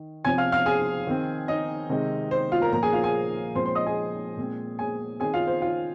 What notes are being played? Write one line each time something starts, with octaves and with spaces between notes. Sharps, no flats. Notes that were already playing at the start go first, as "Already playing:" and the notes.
Already playing: D#3
C3 F3 C4 G#5 G#6
F5 F6
F5 F6
G#4 G#5
D#3 C4
D#4 D#5
C3 D#3 G#3 C4
C5
F4 F5
A#4 A#5
A#2 F3 A#3 A#4 A#5
G#4 G#5
F4 F5
G#4 G#5
A#2 F3 G#3 C4 C5 C6
C5 C6
D#5 D#6
G#4 G#5
A#2 G#3 C4
G#4 G#5
D#3 C4 G#4 G#5
F4 F5
C5
F4 F5